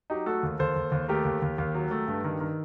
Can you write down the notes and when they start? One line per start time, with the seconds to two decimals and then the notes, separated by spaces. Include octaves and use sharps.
0.10 F#3 D#4 G4
0.26 A3 F#4 A4
0.43 D#2
0.59 D#2 A4 C5
0.76 D#2
0.92 D#2
1.09 A3 G4 A#4
1.25 D#2
1.42 D#2
1.58 D#2
1.75 F#3
1.91 A3
2.08 G2
2.24 D#3
2.40 D#3